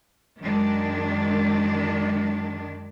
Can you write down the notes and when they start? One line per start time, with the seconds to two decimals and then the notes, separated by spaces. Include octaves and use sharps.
0.41 F#2 D#3 G#3 D4